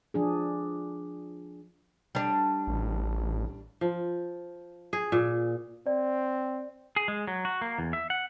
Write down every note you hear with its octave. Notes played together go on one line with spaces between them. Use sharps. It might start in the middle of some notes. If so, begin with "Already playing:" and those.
F3 D4 G#4
G3 D4
A1
F3
G#4
A#2
C4 D5
G#4
G#3
F#3
F#4
A#3
E2
E5
F#5